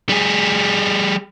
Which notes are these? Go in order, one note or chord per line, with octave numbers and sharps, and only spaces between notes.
G3 G#4